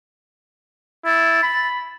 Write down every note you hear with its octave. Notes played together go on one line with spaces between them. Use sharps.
E4 A6
B5